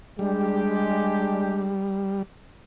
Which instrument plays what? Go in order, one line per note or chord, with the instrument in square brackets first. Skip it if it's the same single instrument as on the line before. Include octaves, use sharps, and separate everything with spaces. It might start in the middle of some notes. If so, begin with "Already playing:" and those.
[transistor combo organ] G3 [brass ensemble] G#3 D4 G4